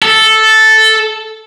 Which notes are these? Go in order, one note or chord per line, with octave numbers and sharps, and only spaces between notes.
A4